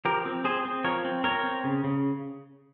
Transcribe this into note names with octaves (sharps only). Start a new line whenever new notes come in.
F3 G4 A#4
C4
C4 G#4 C5
C4
F3 A#4 C#5
C4
C4 A#4 C#5
C4
C#3
C#3